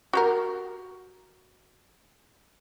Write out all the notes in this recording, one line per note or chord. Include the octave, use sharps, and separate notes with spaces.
F#4 G4 A#4